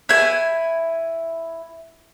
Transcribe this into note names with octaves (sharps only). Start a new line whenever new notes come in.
E4 G#5